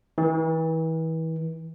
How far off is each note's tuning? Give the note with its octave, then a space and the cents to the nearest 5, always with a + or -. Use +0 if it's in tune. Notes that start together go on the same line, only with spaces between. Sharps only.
E3 -35